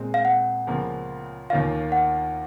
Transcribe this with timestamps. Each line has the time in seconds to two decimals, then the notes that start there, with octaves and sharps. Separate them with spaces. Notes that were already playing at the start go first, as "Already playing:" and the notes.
Already playing: A#2 G#3 C4
0.14 F5
0.25 F#5
0.67 C#2 C#3 F3 A#3
1.50 D#2 D#3 A#3 C#4 F4 F5
1.92 F#5